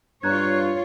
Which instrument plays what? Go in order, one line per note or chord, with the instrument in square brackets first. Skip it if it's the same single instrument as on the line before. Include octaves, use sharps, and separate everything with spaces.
[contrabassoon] G2 [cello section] F4 C#5 [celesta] A#5 F#6 G#6